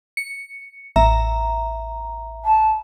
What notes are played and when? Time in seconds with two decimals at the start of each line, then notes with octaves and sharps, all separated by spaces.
0.17 C#7
0.96 A1 E5 A#5
2.45 A5